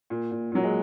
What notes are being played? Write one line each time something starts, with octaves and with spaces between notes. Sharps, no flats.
A#2
A#2
A#2 F#3
G#3